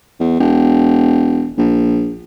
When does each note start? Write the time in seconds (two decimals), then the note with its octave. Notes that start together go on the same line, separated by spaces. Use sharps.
0.20 E2
0.39 E1
1.57 A#1